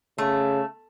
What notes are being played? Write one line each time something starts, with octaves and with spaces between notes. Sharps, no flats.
C#3 A3